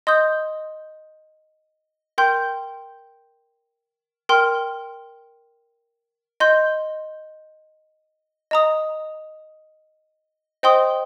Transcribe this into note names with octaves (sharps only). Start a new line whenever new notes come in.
D#5 C6 D#6 G6
A#4 G5 C6 G6
A#4 G5 C6 F6
D#5 C6 G6
D#5 A#5 D#6
C5 D#5 G5 C6 D#6